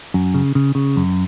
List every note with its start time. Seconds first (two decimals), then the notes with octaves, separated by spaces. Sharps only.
0.14 F#2
0.34 C#3
0.55 C#3
0.75 C#3
0.96 F#2